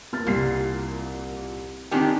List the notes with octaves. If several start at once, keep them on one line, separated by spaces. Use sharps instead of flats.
A#3 F6 A6
C2 A#2 C7
D#3 C4 D4 D#4 G4 G#5